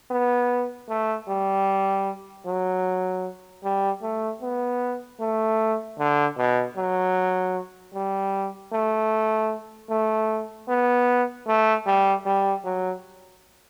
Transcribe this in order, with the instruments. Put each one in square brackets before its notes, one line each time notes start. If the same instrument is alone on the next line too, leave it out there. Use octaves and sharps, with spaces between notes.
[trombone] B3
A3
G3
F#3
G3
A3
B3
A3
D3
B2
F#3
G3
A3
A3
B3
A3
G3
G3
F#3